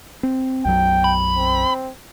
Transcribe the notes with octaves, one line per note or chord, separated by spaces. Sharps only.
C4
B1 F#2 F#3 G5
B5
C4